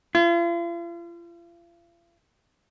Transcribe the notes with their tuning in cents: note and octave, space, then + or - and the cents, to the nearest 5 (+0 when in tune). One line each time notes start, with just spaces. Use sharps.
F4 -40